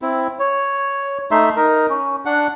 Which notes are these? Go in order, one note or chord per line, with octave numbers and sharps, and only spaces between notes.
C4 E4
C#5
A3 D#4 E5 C6
D#4 A#4
C#4
D4 F#5